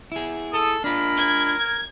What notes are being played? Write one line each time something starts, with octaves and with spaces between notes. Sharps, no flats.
E4 G#4
A4 D#6
G#3 D4 F4 A#4 B5
G#6